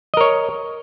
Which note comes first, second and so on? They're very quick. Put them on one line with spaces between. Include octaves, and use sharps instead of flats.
D#5 A#4 C#5